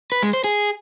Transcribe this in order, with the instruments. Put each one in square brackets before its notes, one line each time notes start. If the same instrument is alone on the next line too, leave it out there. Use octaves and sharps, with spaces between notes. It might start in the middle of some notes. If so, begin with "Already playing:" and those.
[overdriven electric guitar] B4
G#3
C5
G#4